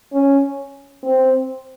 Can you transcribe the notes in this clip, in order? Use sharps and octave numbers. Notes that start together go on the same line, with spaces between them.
C#4
C4